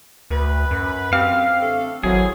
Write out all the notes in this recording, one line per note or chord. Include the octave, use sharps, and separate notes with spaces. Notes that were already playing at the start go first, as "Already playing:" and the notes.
D2 B4
F#2
F#2 C4 G4 F5
D3 A3 A4
G#1 E3 F#3 A3 C4 G#4